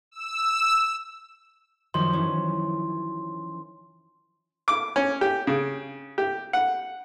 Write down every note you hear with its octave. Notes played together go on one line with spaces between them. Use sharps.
E6
F#2 D#3 F3 C6
E3 C#4
D6
C#4
G4
C#3
G4
F#5